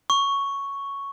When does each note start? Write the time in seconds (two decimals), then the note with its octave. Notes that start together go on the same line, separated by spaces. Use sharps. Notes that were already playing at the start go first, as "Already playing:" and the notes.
0.10 C#6